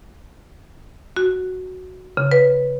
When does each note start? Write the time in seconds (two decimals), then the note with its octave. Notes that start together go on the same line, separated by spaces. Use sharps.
1.17 F#4
2.17 C#3
2.32 B4